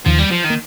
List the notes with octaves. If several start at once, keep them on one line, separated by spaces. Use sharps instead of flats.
D#2 D#3 F3
G3
F3
D#3
A#3